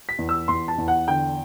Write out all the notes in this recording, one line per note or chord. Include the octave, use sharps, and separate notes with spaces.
B6
E2
E6
E2 C6
A5
E2
F#5
D3 G5